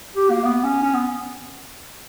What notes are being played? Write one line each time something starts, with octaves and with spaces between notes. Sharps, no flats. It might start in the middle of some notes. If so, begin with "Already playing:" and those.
G4
A#3
B3
C#4
C#4
B3